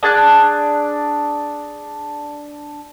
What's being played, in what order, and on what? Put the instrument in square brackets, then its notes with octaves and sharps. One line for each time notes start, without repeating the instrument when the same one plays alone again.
[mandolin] D4 G#4 A5 F#6